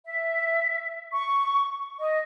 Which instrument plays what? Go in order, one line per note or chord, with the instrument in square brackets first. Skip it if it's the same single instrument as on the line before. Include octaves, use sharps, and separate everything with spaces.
[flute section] E5
C#6
D#5